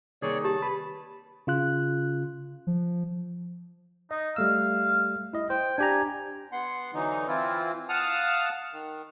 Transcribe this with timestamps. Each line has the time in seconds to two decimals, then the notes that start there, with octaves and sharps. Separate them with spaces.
0.22 C2 D#3 A#3 G#4 C#5 D5
0.44 G4 A5
0.62 B4
1.47 C#3 F4 F#6
2.67 F3
4.11 D#4 D#5
4.36 G3 A3 F5 E6
5.33 E4 D#5
5.50 C5 G5
5.78 D4 G4 G#5 A#5
6.52 B3 F#5 C6
6.94 D3 E3 F#3 D#4
7.28 E3 C4 E4 F4
7.89 F5 F#5 A5 D#6 F6
8.73 D#3